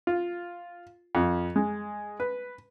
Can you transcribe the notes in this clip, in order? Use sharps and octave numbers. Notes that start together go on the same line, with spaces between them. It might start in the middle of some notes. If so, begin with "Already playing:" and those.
F4
F2
G#3
B4